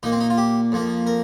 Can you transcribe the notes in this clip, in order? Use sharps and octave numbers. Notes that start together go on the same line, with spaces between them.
A#2 A#3 D#4
C4
D#4
F4
G4
F2 F3 A#3
A#4